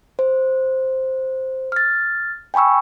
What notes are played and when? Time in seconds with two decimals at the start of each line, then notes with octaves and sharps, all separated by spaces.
0.19 C5
1.72 F6 A6
2.54 G5 G#5 B5 C#6 E6